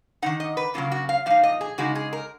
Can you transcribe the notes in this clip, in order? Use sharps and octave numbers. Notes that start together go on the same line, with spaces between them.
D#3 G#3 D#4 F#5
D#5
B4
C#3 F#3 A#3 C#4 F4
F#4
F5
A#2 F3 D#4 F5
D#5
G#4
C#3 G#3 D#4 F#4
G#4
A#4